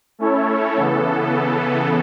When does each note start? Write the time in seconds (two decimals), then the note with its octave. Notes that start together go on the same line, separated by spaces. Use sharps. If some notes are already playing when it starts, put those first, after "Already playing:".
0.19 A3 C#4 E4 A4 C#5
0.76 C#3 E3 B3 A4